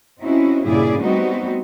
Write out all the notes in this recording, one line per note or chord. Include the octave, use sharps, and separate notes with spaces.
C4 C#4 D#4 E4 F#4
G2 A#2 C#3 E4 G#4 D5
G3 A3 B3 C4 D#4 F#4